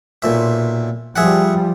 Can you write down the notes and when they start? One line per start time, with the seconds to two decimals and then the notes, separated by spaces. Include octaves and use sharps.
0.22 B1 A#2 E5
1.16 F3 G3 G#4 E5 F#5